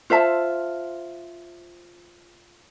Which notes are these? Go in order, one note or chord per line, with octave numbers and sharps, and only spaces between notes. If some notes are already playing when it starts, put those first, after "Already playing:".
F4 C5 E5 A5